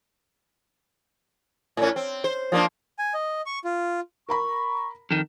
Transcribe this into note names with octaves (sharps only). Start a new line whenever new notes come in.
A2 C#4
C4
C5
F3 A#3 D4
G#5
D#5
C#6
F4
A#4 A#5 B5 C#6
F2 D#3